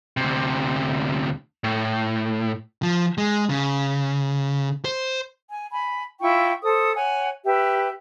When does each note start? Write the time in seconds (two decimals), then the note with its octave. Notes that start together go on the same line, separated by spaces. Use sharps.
0.17 D2 C3
1.64 A2
2.83 F3
3.18 G#3
3.50 C#3
4.85 C5
5.50 G#5
5.72 G#5 B5
6.20 E4 F4 G5 C#6
6.62 A4 C5 D#6
6.94 C#5 F#5 G#5
7.45 G4 B4 E5